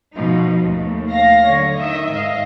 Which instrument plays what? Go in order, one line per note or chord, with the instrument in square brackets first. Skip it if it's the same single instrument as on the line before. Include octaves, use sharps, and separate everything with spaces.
[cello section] B2 F3 D#4
D#2 A3
[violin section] F5 A#6
[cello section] D3 F#3 [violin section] C#5
[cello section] D#3 [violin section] D#5 E5
[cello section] G#2 F5 [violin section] D#5